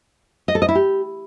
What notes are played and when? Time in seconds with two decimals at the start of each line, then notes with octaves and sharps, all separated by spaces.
0.48 D#5
0.55 A4
0.62 D#5
0.68 E4
0.75 G4